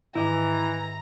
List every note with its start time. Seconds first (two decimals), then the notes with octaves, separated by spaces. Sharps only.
0.15 G#2 D#3 E3 E4 D#5 A#5 D6